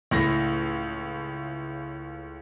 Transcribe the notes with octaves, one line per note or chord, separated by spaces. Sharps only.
C#2 A2 A#6